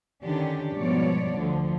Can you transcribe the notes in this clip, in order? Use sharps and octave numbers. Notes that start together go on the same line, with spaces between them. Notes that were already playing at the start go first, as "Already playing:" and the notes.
D3 D#3 C#4 D4 G4
G#2 B2 F3 G3 C#5 D5
D2 D3 F3